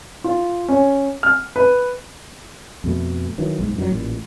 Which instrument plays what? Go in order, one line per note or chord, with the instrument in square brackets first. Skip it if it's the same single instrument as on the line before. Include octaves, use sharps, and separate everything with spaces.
[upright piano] F4
C#4
F6
B4
[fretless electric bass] F2 B2 A3
D#3 E3 F#3
B1 G#2
F#2 D#3 F#3
A1 A#2